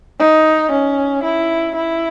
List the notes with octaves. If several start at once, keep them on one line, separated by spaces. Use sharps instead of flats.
D#4
C#4
E4
E4